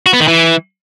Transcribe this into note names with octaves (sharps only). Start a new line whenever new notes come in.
F#4
B3
D#3
E3